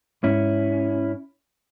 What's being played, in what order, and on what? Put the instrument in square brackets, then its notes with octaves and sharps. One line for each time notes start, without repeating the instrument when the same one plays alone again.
[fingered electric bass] G#2 [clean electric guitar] C#4 E4